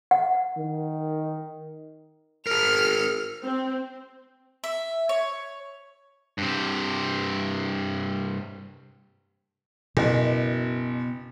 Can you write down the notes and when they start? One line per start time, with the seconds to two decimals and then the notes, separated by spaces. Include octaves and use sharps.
0.11 F#5
0.58 D#3
2.47 G#4 A#4 F6
3.45 C4
4.64 E5
5.09 C#5
6.38 G2 C3
9.97 F#1 B2